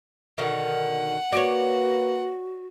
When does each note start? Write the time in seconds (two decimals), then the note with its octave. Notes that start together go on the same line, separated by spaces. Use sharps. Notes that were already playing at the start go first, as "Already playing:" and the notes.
0.38 B2 D3 D#3 F#5
1.32 A#3 F#4 B4 C#5 D5